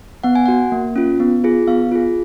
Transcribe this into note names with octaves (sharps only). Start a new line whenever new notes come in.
B3 F#5
G#5
F#4 F#5
A#3
C#4 F4
B3
F4 G#4
B3 F5
F4 G#4